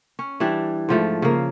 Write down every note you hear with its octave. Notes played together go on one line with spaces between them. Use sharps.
C#4
E3 G3 D4
G#2 F3 A3
C#3 A#3